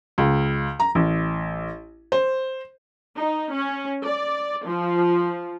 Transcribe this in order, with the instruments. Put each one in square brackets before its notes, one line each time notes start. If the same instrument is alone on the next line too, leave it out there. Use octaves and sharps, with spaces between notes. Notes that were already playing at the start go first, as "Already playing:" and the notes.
[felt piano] C#2
A#5
A1
C5
[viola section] D#4
C#4
D5
F3